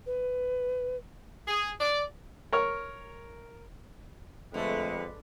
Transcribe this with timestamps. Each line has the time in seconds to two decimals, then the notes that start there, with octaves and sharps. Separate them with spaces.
0.06 B4
1.46 G#4
1.80 D5
2.52 A#4 C#5 F6
4.54 F2 D3 G#3 A3 B4